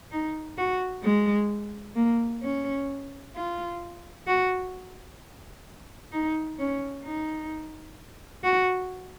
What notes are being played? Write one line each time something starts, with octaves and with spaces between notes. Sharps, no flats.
D#4
F#4
G#3
A#3
C#4
F4
F#4
D#4
C#4
D#4
F#4